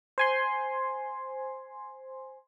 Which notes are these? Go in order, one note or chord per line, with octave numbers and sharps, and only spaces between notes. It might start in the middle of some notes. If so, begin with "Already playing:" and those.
C5 G#5 C6